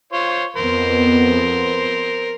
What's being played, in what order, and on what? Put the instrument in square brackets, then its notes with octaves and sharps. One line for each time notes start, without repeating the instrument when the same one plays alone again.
[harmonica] F4 C5 C#5
[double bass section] F2 B3 [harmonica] A#4 C5